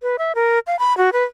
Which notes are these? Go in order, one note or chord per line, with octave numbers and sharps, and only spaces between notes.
B4
E5
A#4
F5
B5
F#4
B4